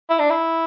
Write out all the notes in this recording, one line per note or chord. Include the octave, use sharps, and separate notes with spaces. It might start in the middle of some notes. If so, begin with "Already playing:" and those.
E4
D4
E4